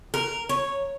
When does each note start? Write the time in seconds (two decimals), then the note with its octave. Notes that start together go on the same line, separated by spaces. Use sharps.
0.14 A#4
0.49 C#5